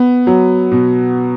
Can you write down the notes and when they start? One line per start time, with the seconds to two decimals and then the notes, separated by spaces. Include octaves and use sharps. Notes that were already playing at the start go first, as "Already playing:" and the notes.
Already playing: B3
0.27 F#3
0.72 B2